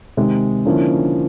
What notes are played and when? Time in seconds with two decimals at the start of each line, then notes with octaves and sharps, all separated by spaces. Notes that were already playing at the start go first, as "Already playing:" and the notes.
0.17 C3 D#3 G#3
0.65 D3 F3 A#3 C#4 E4